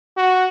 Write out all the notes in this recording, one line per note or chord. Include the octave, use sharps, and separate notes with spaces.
F#4